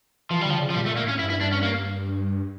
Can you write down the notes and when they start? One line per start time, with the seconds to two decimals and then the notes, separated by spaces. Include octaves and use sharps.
0.30 E3 F3
0.41 G3
0.46 D3 F3
0.60 C#3
0.70 F3
0.74 A#2 G3
0.86 A3
0.89 A#2
0.97 A#3
1.04 A2 C#4
1.18 G2 E4
1.30 E4
1.41 D4
1.52 C#4
1.63 A#3